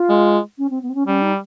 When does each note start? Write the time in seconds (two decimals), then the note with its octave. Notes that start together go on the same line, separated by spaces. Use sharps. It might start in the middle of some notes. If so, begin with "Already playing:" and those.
Already playing: F4
0.09 G#3
0.58 C#4
0.70 C4
0.83 B3
0.89 C4
0.95 C#4
1.07 G3 C#4
1.21 D#4